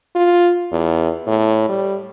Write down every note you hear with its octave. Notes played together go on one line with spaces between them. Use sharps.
F4
E2
A2
G3